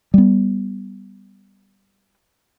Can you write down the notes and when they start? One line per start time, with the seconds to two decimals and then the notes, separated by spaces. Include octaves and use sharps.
0.14 G3 B3